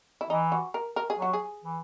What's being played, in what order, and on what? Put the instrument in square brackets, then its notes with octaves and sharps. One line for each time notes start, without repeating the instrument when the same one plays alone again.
[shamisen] E4
[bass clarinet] E3 [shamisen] D#4
[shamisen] F#4
A#4
A#4
G#4
[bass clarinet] F#3 [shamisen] F#4
[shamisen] G#4
[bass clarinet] E3